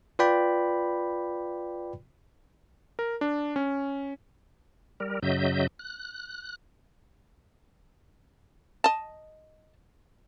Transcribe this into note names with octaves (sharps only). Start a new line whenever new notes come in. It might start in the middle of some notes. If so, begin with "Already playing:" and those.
F4 B4 D5 G5 B5
A#4
D4
C#4
G3 A#4
F#2 C#3 F#3 D#5 E5 G6
F#6
D#5 A5